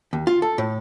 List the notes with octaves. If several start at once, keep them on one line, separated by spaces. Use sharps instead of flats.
D#2
F4
A4
A2